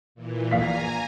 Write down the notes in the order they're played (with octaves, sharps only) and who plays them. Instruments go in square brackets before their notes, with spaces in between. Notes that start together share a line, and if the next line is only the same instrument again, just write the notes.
[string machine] A#2 E3
[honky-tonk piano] A#1 F5 B6 [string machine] G#5 A#5